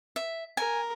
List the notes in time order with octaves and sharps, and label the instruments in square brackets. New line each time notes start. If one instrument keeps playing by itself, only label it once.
[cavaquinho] E5
[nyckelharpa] A#4 [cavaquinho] G#5